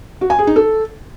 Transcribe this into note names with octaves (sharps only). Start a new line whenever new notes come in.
F#4
G#5
G#4
D#4
A4